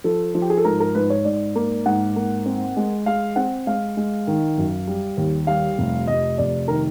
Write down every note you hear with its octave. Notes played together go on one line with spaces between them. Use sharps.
F3 A4
F3
G4
G#4
A4
G#2 A#4
A#4
G#2 B4
C#5
G#2 D5
A#3
G#2 F#5
A#3
C4
G#3
G#3 F5
C4 F#5
G#3 F5
G#3
D#3
F#2
G3
D#2
G3 F5
F1
F1 D#5
F1 D5
D#3 A#4